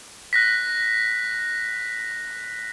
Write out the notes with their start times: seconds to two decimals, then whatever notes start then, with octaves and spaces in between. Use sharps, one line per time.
0.33 F#6 A#6 B6